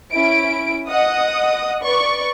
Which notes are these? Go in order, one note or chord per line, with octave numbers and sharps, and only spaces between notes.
C#4 E4 D7
D#5 F#5 D#6
B4 D5 C#6